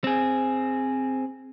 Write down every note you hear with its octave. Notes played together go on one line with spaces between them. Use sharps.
C4 G#4